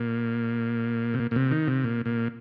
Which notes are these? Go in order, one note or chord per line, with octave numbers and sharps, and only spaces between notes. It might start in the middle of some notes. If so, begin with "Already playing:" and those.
Already playing: A#2
C3
A#2
A#2
C3
D#3
C3
A#2
A#2